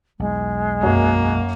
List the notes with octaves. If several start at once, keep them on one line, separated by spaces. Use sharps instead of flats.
B1 E2 G#3
F#2 A#3